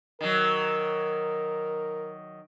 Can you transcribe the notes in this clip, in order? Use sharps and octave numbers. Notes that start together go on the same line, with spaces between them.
D#3 F#3 A#4